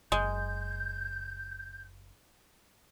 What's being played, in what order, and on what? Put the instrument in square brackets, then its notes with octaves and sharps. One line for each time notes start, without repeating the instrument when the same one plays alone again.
[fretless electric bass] F#1 [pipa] G#3 [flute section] G6